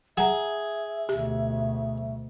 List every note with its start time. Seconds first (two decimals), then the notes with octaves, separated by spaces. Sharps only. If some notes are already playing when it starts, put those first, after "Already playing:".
0.17 G#4 E5 F#5 A#5
1.09 D2 B2 G4